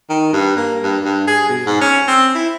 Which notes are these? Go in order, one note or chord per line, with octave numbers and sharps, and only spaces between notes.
D#3
G2
A#3
G2
G2
G#4
B2
G#2
C#4
C4
E4